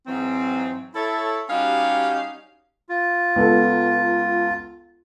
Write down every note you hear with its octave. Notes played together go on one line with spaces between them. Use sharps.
G#2 E3 F#3 C4
E4 A4 C#5
G3 C#4 D#4 F#4 G4 F5
F4
C#2 B3 A4